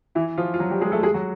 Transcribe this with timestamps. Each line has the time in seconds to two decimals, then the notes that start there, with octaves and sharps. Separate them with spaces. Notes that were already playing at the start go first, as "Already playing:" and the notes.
0.15 E3 E4
0.38 F3 F4
0.54 F4
0.59 F#3 F#4
0.70 G3 G4
0.81 G#3 G#4
0.92 A3 A4
1.03 G#3 G#4
1.14 F#3 F#4